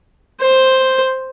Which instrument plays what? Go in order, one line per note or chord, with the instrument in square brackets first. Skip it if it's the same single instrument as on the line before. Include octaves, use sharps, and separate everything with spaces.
[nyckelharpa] C5